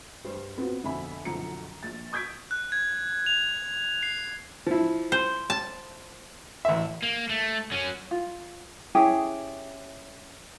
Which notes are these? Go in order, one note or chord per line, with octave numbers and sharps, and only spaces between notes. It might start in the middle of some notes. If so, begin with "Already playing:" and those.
G2 G3 C5
B3 C4 F4 F#4
F2 B2 D3 E5 G#5 B5
B1 F#2 D3 F3 A#5 C#7
A#1 A6
C#6 D#6 G6 G#6 B6 D7
F#6
G#6
F7
C7
F3 E4
C5
A5
A1 E5
A#3
A3
F#3 C#4
F4
C#4 E4 G4 G#4